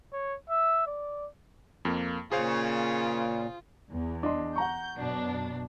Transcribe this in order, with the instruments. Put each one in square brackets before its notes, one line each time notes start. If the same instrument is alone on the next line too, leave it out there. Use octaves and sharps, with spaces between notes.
[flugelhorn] C#5
E5
D5
[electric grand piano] F2 A#3
[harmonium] A#2 [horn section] C#3 [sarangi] F4 [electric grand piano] G#4 C5 F5
[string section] E2
[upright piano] D4 D#5 C6
[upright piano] F#5 A#5 C#6 [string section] G6
[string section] F#2 B2 D4